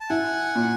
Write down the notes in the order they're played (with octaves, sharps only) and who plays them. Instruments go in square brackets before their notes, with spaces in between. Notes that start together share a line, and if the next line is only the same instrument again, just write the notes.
[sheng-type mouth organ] A5
[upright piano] E4 [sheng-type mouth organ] F#5 G#5
[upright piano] A#2